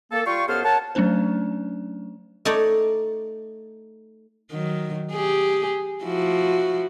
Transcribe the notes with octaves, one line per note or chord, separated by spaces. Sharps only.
A#3 A4
G3 F4 F5 G5 C#6
F#2 B3 G#4 A4 C5 F6
A#4 C#5 F#5 A5
F#3 A3 C#4 D4 C5
A3 D#4 C#5 D5
D#3 F#3
G4 G#4
F3 E4 F#4